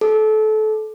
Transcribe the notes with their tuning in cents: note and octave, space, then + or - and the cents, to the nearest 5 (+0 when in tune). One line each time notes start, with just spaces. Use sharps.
A4 -25